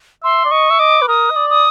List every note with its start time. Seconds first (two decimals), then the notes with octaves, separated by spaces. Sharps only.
0.24 E5 C6
0.45 D5
0.51 D#5 C#6
0.70 E5
0.79 D#5 D6
1.02 B4
1.08 A#4 D#6
1.31 D#5
1.36 D5
1.50 D#6